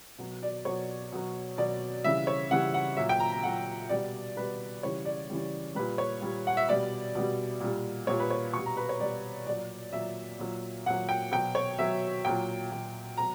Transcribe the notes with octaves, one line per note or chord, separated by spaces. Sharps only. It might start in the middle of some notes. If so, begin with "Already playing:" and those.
B2 F#3
D5
B2 F#3 C#5
B2 F#3
B2 F#3 D5
C#3 E3 G3 E5
C#5
C#3 E3 G3 F#5
F#5
A#2 F#3 E5
G5
A#5
A#5
A#2 F#3 F#5
B2 G3 D5
B2 G3 B4
C#3 E3 G3 C#5
D5
C#3 E3 G3
A#2 G3 B4
C#5
A#2 G3
F#5
E5
B2 G3 D5
B2 G3
A#2 G3
A#2 G3 C#5
B4
C#5
B2 G3 C#6
A#5
B4
C#5
B2 G3 D5
A#2 F#3 D5
A#2 F#3 E5
A#2 F#3
A#2 F#3 F#5
G5
B2 F#3 G5
C#5
B2 F#3 E5
A#2 F#3 G5
A#2 F#3
B2 F#3 A#5